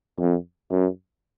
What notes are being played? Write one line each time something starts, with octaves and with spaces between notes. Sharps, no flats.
F2
F#2